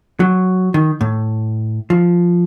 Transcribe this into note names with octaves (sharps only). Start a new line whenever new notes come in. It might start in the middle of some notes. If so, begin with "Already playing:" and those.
F#3
D#3
A2
F3